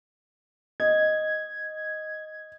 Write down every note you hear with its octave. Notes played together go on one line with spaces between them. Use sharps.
D#5 G#6